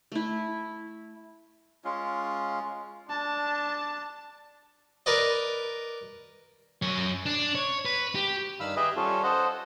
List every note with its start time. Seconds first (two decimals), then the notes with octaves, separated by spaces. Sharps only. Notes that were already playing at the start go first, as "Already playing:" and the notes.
0.12 A3 E4
1.84 G#3 C#4 F4
3.09 D4 A5
5.06 A#4 B4 D5 D#5
6.82 F#2 C#5
7.26 D4
7.55 C#5
7.85 B4
8.15 G4
8.60 G2 D#3 F5 B5 E6
8.77 G4 G#4 B4 D#5 E5
8.96 G3 C#4 F4 A4
9.23 A4 C5 D#5 F#5